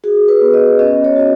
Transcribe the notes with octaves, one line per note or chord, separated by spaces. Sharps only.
F#4 G#4
B4
B3
D#5
C#4 D#5
C#5
F#4 D#5